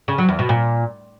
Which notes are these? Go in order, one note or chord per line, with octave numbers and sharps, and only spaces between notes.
C#3
F#3
E2
B2
A#2